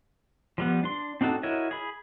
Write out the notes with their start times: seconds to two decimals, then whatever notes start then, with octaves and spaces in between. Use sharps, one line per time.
0.58 F3 G3 B3
0.84 D4 C6
1.21 C4 D4 D#4 F#4 A4
1.43 E4 F#4 A#4 C#5 D#5
1.71 G#4 B5